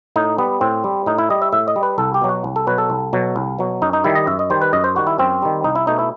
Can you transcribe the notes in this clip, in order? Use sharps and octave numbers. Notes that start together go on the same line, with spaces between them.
A2 D#4
G3 B3
A2 C4
G3
A2 D#4
E4
G3 D#5
E5
A2 E5
D#5
G3
B4
C2 A4
G4
B2 F#3
F#4
C2
A4
B2 F#3 B4
A4
C2
B2 F#3
C2
B2 F#3
F#2 D#4
D#4
D#3 G3 E4
D#5
F#2 E5
D#5
D#3 G3 C5
B4
F#2 D#5
C5
D#3 G3 F#4
E4
F#2 C4
D#3 G3
C2 D#4
E4
B2 A3 D#4
E4